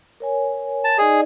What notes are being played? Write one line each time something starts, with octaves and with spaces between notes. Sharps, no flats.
A#4 C#5 G#5
A5
D#4 G#4 D5 D#5